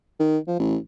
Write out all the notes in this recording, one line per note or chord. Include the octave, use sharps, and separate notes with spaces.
D#3
F3
A1